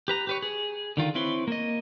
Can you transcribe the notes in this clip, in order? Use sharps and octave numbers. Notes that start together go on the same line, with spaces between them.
G4 B4 A#5
G4 B4 C#5
G#4
D3 D#3 F4
C4 E4 B4 C#5 C6
A#3 D#5